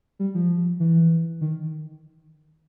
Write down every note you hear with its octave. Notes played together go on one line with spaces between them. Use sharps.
G3
F3
E3
D#3